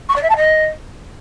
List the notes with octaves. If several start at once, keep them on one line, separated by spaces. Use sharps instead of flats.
C#6
D5
E5
A5
D#5